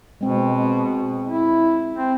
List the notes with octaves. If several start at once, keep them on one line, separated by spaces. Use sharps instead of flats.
B2 G#3 C4
E4
C4